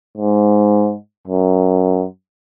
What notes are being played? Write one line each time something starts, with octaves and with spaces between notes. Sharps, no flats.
G#2
F#2